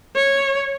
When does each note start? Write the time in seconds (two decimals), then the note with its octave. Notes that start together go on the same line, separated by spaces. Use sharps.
0.16 C#5